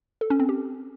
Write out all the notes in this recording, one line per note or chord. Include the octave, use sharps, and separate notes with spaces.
A4
C#4
C4
G4